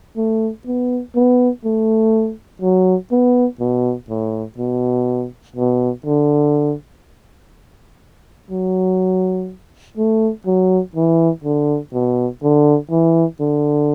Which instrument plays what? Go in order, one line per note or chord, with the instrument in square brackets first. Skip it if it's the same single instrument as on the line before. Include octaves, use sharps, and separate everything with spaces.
[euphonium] A3
B3
B3
A3
F#3
B3
B2
A2
B2
B2
D3
F#3
A3
F#3
E3
D3
B2
D3
E3
D3